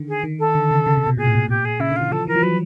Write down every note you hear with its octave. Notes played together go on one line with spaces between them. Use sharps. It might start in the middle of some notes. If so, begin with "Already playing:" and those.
Already playing: D3 D#3
G#4
D#3
A4
D3
C#3
C#3
C3
B2
A#2 G#4
A2
A#2
A#2 G4
G#4
C#3 E4
D3
F4
E3
F3 A4
E3 A#4
F3
F#3 B4